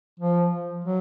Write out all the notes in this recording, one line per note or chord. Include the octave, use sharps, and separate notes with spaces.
F3
F#3